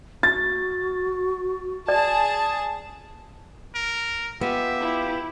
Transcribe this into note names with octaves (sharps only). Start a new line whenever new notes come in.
F#4 A6
G#4 D5 A5
A#4
B3 F4 G4 E5
E4